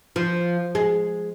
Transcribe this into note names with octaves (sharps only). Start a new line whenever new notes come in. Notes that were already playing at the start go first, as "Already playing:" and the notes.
F3
G#3